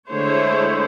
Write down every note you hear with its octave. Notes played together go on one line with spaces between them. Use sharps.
D3 G#3 A3 E4 C5 C#5